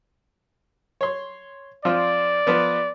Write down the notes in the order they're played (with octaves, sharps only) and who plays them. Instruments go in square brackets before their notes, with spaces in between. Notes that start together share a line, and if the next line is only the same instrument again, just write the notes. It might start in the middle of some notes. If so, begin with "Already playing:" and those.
[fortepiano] C#5 C6
[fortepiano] F3 C4 F4 [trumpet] D5
[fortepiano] F3 B3 B4